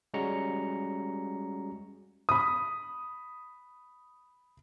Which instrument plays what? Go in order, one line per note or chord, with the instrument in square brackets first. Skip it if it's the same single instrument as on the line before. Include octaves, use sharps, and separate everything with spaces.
[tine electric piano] G3 G#3 C#4 F#4 A#5 C#7
[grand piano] B5 D#6